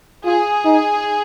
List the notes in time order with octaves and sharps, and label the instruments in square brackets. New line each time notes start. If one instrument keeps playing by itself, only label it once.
[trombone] F4 [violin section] G#4
[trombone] D#4